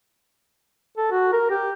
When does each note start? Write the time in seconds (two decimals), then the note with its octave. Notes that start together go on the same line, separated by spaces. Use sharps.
0.98 A4
1.12 F#4
1.33 A#4
1.50 G4